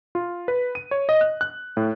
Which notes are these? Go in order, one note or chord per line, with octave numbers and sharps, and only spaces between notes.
F4
B4
D#7
C#5
D#5
F#6
F#6
A2